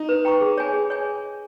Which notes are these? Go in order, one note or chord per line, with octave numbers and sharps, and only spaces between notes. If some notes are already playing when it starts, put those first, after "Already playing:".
Already playing: D#4
B4
G5 A#5 C#6
G#4
C#5 G#5
G#4
C#5 G#5